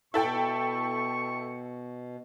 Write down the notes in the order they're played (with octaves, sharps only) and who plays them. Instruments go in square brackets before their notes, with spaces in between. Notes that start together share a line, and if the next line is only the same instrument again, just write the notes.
[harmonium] B2 [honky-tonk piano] E4 A4 G5 [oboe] C#6